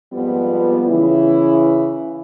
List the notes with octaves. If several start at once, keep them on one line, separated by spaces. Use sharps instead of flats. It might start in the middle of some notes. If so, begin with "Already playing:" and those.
F2 G#2 F3 G3 B3
C#3 E3 E4